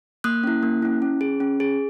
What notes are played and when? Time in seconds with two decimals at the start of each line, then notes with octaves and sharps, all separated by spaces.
0.24 A#3 D#6 F#6
0.44 C#4 E4
0.63 A#3
0.82 C#4 E4
1.02 C#4
1.21 G#4
1.40 C#4
1.60 G#4